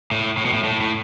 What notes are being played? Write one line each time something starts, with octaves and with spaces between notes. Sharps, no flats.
A2
A2
B2
A2
A2
A2